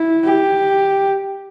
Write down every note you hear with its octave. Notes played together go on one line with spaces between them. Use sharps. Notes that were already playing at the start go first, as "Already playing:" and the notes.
Already playing: E4
G4